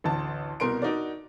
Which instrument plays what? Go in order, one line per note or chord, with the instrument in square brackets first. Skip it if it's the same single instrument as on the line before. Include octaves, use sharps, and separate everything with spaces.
[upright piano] A1 D2 A5
C2 B2 A#4 C6 D7
D4 D#4 F#4 A#4 D5